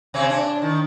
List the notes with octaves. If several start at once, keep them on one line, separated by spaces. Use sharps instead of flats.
C3 C4 C#4
D4
D#3